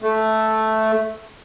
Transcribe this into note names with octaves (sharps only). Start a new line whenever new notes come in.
A3